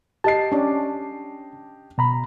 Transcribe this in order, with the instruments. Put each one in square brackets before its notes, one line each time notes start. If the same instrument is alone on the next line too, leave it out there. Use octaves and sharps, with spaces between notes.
[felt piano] G4 D#5 C7 [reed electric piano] A5
[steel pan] C#4 D4
[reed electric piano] B2 A#5 B5